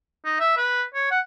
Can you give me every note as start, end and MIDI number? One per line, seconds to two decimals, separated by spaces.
0.25 0.38 63
0.40 0.55 76
0.57 0.82 71
0.94 1.10 73
1.11 1.20 78